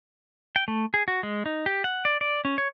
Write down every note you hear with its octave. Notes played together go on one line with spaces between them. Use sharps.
G5
A3
G#4
F#4
G#3
D#4
G4
F#5
D5
D5
C#4
C#5